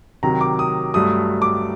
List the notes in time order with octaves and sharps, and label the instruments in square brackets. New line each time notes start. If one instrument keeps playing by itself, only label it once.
[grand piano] C3 D#3 F#3 A#5
D6
D#6
G2 F#3 A3 D#6
D6